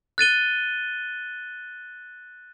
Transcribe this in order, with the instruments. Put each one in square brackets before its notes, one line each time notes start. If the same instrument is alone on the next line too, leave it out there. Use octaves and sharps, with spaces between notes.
[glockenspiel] F#6 A6 D#7 G7